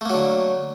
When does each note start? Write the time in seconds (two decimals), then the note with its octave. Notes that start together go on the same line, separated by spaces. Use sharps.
0.01 A3
0.05 A#3
0.10 F#3
0.14 D3